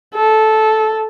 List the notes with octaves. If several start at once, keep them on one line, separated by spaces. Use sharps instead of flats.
A4